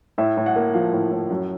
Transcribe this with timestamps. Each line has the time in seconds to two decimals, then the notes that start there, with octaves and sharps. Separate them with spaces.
0.18 A2 E5
0.37 A2
0.46 F#5
0.56 A#3
0.74 F3 F5
0.93 A2
1.11 A2
1.30 F#2